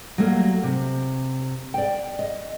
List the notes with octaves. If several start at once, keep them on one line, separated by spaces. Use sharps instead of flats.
F#3 G3 A3 A#3 F#4
C3
D5 G5
D#5